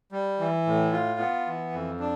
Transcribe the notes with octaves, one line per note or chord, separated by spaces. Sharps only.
G3
E3
A2
F4
B3
E3
F2
D4